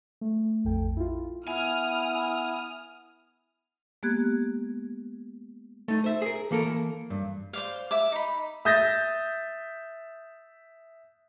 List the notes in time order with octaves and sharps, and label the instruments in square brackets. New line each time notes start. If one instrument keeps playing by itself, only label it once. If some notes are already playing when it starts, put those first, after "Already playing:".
[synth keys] A3
A#1 F2 A4 G5
E4 F4
[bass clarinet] B3 [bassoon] E4 [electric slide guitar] G#5 [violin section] D#6 F6
[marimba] G#3 A#3 B3 G4 F#6 G#6
[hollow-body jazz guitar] A3 D#4
C5 E5
G#4 A#4
E3 A#3 A4 A#4
G2
[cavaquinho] C5 D5 F5
E5 D6
D#4 B5
[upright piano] E5 D#6 G6 A6 A#6